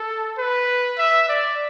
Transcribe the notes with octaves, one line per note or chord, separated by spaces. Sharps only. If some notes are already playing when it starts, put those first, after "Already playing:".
Already playing: A4
B4
E5
D5